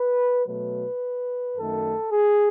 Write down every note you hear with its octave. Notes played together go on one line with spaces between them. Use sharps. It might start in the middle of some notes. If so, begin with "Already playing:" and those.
Already playing: B4
B2 F#3 A3 B4
F#2 D#3 A3 A4
G#4